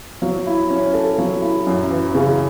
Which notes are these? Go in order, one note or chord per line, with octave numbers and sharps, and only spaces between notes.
F#3
E4
C#4
A4
F#3
E4
F#2
E3
C#3